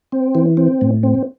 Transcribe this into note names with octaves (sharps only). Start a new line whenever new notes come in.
C4
E3
C4
A2
C4